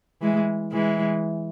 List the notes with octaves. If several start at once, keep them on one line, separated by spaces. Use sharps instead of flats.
E3 G#3
E3 G#3